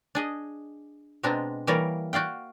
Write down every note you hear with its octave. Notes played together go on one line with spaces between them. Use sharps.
D4 G#4 D#5
B2 G#3 C4 D4 A#5
E3 G3 A#3 A#4 C#5 D5
F#4 D5 F5 G5